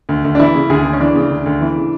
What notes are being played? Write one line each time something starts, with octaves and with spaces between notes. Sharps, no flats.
D2
D2
D4
E3 E4
C#3
D2 G#4
D2
C#4
E3 D4
C#3
D2
D2
E3
C#3